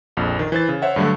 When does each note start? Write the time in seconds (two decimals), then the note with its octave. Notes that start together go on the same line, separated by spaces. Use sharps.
0.17 A#1 F2
0.39 D#3
0.52 E3 C5 A6
0.69 C#3
0.82 C5 C#5 E5 F#5
0.96 G2 D3 F#3 A3